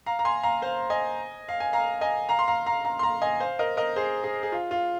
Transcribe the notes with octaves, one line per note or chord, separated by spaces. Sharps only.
F5 A#5
A#5
G#5 C6
F5 A#5
C5 F5
D#5 G#5
F5
G#5
F5 A#5
D#5 G#5
F5 A#5
C6
F5 A#5
F5 A#5
F5 A#5
C6
F5 A#5
D#5 G#5
C5 F5
A#4 D#5
A#4 D#5
G#4 C5
G#4
G#4
F4
F4